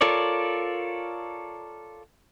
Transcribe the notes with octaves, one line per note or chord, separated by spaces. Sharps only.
F4 A4 A#4 C#5 D5